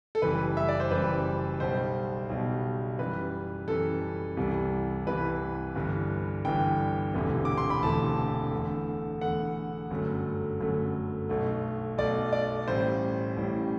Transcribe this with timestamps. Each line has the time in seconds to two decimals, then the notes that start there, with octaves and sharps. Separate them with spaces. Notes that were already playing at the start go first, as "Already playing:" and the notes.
0.15 A4
0.22 F#1 F#2 E3 G3 B4
0.57 E5
0.68 D5
0.80 C5
0.91 F#1 F#2 E3 G3 B4
1.60 B1 B2 G3 C5
2.30 B1 B2 G3
2.99 F#2 E3 G3 B4
3.68 F#2 E3 G3 A4
4.37 C2 C3 E3 G3
5.06 C2 C3 E3 G3 B4
5.75 G1 G2 E3
6.44 G1 G2 E3 G5
7.14 E1 D2 C3 E3 A3
7.45 D6
7.57 C6
7.70 B5
7.83 E1 D2 C3 E3 A3 A5
8.52 E2 D3 A3
9.21 E2 D3 A3 F#5
9.90 G1 F#2 F#3 A3
10.60 G1 F#2 F#3 A3
11.29 B1 B2 A3
11.98 B1 B2 A3 D5
12.33 D5
12.68 A1 A2 G3 C5
13.37 A1 A2 G3